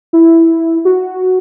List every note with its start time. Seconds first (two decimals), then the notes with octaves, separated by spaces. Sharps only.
0.13 E4
0.85 F#4